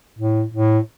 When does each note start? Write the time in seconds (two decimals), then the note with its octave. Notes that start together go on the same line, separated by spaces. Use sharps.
0.19 A2
0.54 A2